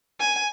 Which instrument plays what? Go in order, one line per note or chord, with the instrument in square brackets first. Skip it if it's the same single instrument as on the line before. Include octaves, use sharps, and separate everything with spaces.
[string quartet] G#5